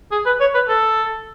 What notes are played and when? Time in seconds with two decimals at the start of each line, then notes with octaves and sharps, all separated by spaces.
0.12 G#4
0.26 B4
0.40 C#5
0.54 B4
0.69 A4